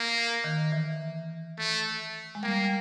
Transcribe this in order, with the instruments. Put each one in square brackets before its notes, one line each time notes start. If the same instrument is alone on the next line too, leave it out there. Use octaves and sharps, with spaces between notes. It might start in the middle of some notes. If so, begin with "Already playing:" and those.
Already playing: [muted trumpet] A#3
[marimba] D#3
E3
[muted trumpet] A3
[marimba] G#3
[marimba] G3 [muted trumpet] A#3